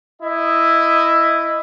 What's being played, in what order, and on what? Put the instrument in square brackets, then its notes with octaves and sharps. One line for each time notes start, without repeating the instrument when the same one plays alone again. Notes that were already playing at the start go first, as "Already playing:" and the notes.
[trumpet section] E4 D#5